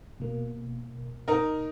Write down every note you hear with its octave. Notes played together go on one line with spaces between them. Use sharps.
B2 A#3
D#4 A#4